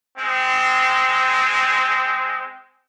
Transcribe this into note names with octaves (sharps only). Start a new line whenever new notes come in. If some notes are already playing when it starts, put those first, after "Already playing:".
G#3 C4